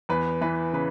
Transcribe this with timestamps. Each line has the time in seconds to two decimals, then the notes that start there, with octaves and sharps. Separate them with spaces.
0.09 E2 B4
0.41 E3 B4
0.73 C#3 B4